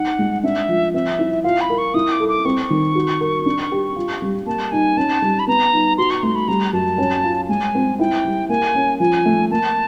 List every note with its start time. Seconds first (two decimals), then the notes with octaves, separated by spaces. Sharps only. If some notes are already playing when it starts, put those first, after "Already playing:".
Already playing: D#4 F#5
0.19 G#3
0.43 D4 E5
0.69 F3
0.94 C4 E5
1.19 E4
1.44 F4 F5
1.61 B5
1.70 A#4
1.78 C#6
1.94 E4 D#6
2.12 D6
2.20 A4
2.29 D6
2.45 C4 C#6
2.70 D#3
2.95 F#4
3.21 A#4
3.46 D4
3.72 G4
3.96 F4
4.22 G3
4.46 A#3 A5
4.71 D#4 G#5
4.97 C#4 A5
5.22 G3
5.39 B5
5.47 B3 A#5
5.73 D#4
5.98 F#4 C6
6.11 C#6
6.23 A3 C6
6.35 B5
6.48 G3 A#5
6.73 F#2 A5
6.98 C#4
7.24 F4
7.49 G#3 G#5
7.75 C4
7.99 E4 G5
8.25 G3
8.49 A#3 G#5
8.75 C#4
9.00 F3 G#5
9.26 A3
9.51 A#3 A5